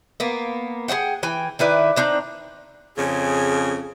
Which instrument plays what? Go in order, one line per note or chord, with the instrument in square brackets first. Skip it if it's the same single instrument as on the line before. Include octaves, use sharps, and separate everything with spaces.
[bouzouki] A#3 B3
G#4 C5 F#5 G5
E3 G5 G#5
D#3 E4 B4 D5
C4 D4 D#4 A#5
[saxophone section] F2 C#3 [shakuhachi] G#4